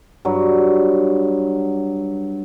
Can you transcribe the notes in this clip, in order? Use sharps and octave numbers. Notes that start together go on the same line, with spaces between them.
G2 F#3